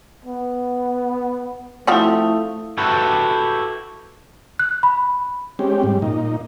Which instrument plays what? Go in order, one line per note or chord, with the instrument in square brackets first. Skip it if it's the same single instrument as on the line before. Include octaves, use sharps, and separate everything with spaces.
[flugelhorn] B3
[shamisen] F3 C4 F#4 [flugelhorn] A3 [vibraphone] E4 F5 D#6
[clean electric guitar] E4 F#4 G4 A4 B4
[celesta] F#6
B5
[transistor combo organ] G#3 C4 C#4 G4
G#2 G3
A#2 D#4